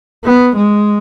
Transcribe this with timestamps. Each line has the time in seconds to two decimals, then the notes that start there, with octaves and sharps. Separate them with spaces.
0.25 B3
0.56 G#3